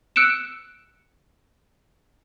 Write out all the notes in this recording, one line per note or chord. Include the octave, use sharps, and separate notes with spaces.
E6 F#6 C#7 D7 E7